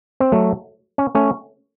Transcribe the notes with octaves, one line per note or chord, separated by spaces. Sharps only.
C4
F#3 A3
C#4
A3 C#4